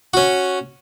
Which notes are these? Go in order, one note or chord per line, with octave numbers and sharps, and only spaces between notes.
C#4 F#4